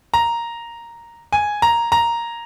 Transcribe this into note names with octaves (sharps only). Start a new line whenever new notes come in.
A#5
G#5
A#5
A#5